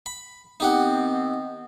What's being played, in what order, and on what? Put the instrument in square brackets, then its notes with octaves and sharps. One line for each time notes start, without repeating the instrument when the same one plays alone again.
[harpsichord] B5
[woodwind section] D#3 B3 C4 [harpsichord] D#4 G4 F#5